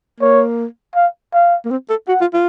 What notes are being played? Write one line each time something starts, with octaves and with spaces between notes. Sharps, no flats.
A#3 C#5
F5
F5
A#3
C4
A4
F#4 F#5
F4
F4